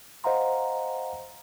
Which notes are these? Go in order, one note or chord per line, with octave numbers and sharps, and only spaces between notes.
C5 D#5 F5 F#5 A#5 C6